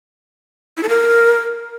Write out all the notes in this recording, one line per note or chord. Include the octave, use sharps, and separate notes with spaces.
E4
A4
A#4